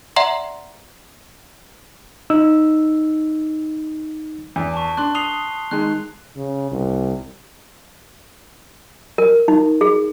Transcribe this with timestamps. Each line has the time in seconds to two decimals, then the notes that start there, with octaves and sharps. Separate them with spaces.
0.16 D5 E5 F#5 A#5 C6
2.30 D#4 E6
4.56 E2
4.74 A5 C#6
4.97 D4 C6 F#6
5.15 D#6 C7 F7 G7
5.71 D#3 G#3 F#6
6.36 C#3
6.71 C2
9.18 A#4
9.48 D#4
9.81 G#4